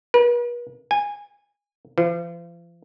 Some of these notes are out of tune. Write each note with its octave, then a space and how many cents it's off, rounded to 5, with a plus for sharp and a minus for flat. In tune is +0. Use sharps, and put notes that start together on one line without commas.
B4 -45
G#5 -20
F3 -40